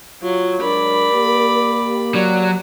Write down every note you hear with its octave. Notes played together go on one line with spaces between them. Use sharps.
F#3 F4
F#3 G#3 D4 A#4 D5 B5
A#3 G4
F#3 D5